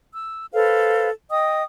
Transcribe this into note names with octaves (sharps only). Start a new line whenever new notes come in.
E6
A4 B4 C5 F5
D#5 G5 D#6